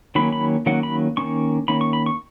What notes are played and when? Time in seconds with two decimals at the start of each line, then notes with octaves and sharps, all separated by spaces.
0.15 D#3 F#3 A#3 C#4 B5
0.32 B5
0.66 D#3 F#3 A#3 C#4 F#5
0.83 B5
1.17 D#3 A#3 C#4 C#6
1.68 D#3 A#3 C#4 B5
1.81 C#6
1.93 B5
2.06 C#6